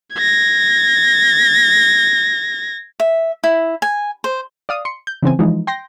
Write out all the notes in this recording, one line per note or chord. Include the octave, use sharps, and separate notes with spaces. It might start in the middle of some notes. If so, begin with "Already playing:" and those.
G#6 A#6
E5
E4
G#5
C5
D5 F5 D#6
C6 C#7
G6
C#3 E3 C4 G#5
E3 F3 G#3 D#4
G5 C6 G6 A#6